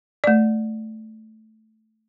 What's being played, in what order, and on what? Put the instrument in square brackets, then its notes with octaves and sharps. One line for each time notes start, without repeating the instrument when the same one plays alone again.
[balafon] A3 D5